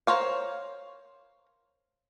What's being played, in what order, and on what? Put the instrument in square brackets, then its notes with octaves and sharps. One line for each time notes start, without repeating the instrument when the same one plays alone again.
[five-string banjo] A#4 C5 C#5 F5